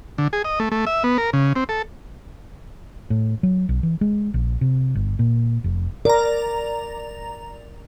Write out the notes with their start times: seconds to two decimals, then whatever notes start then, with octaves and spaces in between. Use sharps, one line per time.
0.18 D3
0.33 G#4
0.45 D#5
0.60 A3
0.71 A3
0.87 E5
1.04 B3
1.18 A#4
1.33 C#3
1.56 C4
1.69 A4
3.10 A2
3.43 F#3
3.69 B1
3.83 E3
4.01 G#3
4.34 A#1
4.61 C3
4.95 G1
5.19 A#2
5.64 F1
6.05 A#4 D5 A#5